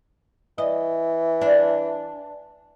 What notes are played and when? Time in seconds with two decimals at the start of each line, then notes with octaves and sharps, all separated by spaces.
0.58 E3 D#5
1.41 D4